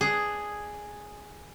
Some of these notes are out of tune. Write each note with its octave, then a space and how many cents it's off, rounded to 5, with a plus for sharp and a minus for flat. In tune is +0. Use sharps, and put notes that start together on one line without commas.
D4 +10 G#4 +0